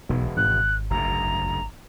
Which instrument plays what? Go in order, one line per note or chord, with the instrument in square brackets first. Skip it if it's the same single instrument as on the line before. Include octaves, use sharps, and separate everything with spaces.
[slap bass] E1 [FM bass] B1
[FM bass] G#1 [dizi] F#6
[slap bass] F#1 D2 G#2 [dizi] A#5